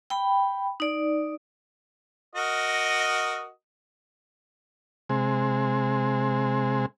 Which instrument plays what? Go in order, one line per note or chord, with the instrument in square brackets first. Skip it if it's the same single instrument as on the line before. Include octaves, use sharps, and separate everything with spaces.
[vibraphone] G5 B5
D#4 D5
[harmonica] F#4 A#4 D#5
[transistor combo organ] C3 G#3